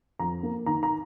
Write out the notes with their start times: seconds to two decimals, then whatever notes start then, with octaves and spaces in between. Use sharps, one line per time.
0.19 F2 A#5
0.43 A#3
0.66 D#3 A#5
0.83 A#5